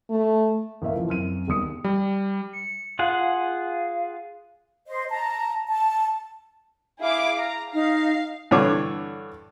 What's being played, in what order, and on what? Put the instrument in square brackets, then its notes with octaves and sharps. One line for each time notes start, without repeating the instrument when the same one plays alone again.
[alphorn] A3
[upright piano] A1 A#3 E5 F5
E3 F3
F#2 C4 F6 D#7
E1 D#2 G3 D#6 C#7
[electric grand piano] G3
[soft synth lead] C#7
[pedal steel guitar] F4 G#4 F#5 [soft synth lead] F5
[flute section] C5 D#5
A5 A#5
A5
[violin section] E4 G#4 D6 [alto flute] F5
[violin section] A#5
[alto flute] D#4 [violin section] F5
[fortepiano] G2 D3 E3 C#5 D6